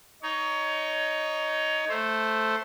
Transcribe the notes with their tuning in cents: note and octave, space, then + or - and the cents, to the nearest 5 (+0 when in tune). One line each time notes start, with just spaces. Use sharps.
D#4 +0 C#5 +20
A3 +0 C5 +5